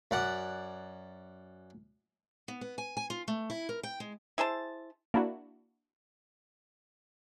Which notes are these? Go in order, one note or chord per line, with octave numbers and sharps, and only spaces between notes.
F#2 D5 F#5
B3
B3
G#5
G#5
F4
A3
E4
A#4
G5
G#3
E4 G#4 C5 A5
A#3 D4 E4 F#4